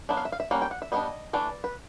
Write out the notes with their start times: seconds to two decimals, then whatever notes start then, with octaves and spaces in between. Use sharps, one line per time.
0.09 F#3 B3 D4 E5
0.17 F5
0.25 E5
0.32 F5
0.40 E5
0.51 G3 A#3 C#4 F#5
0.62 G5
0.71 F#5
0.82 E5
0.92 G3 B3 D4 D#5
1.33 E3 A3 D4 D5
1.64 B4